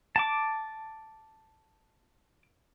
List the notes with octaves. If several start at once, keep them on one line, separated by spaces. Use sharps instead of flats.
A5 D6